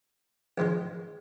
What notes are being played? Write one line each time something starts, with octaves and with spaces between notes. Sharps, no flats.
A#1 G#2 D#3 G#3